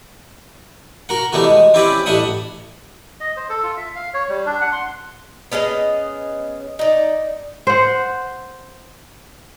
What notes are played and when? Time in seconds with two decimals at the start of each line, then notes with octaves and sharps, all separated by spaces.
1.09 F#4 A#4 F#5
1.33 E3 G3 A3 B3 F#4
1.44 G#3
1.74 C4 C#4 E4 G4 B4 D5
2.06 A1 G3 D4 E5 F#5 D#6
3.20 D#5
3.37 C5
3.50 A4
3.63 F4
3.77 E5
3.95 F5
4.14 C#5
4.29 G3
4.46 D4
4.61 F#5
4.72 C6
5.52 B3 C#4 G#4 D#5
6.79 D#4 D5
7.67 C5 F#5